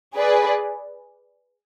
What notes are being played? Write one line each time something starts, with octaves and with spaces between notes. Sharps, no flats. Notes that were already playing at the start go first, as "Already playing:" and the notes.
G#4 B4 D5